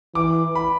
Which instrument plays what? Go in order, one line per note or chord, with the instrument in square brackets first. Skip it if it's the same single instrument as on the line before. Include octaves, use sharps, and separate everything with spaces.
[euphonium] E3 [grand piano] D6
[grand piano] B5